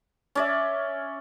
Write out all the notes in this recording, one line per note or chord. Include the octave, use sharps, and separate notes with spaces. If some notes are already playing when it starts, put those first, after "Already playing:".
C#4 D5 E5